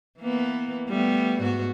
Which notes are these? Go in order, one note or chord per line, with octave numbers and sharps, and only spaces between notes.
E3 A#3 B3
G3 A3 B3
G#2 B3 F#4